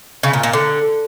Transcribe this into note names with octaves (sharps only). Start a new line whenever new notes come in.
C#3
A#2
A#2
D3